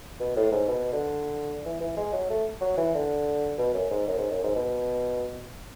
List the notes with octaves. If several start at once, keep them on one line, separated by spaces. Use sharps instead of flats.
B2
A2
G#2
B2
D3
E3
E3
G#3
F#3
A3
F#3
E3
D3
B2
F#2
G#2
F#2
G#2
F#2
G#2
B2